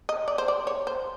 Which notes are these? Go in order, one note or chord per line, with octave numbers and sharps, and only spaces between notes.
D#5
D5
C5
D5
C#5
C5